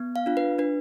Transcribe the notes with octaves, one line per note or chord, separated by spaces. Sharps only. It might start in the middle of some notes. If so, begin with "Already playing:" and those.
Already playing: B3
F5
D4 F4
B4
D4 B4